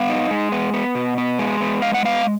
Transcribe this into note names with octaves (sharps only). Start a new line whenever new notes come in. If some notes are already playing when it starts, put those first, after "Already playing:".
Already playing: B3 F5
D#4
G#3
B3
B3
B2
B3
G#3
B3
G#3 F5
F#5
B3 F5